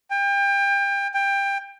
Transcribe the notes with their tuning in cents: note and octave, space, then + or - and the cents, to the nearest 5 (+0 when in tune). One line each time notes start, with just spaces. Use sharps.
G5 +30
G5 +20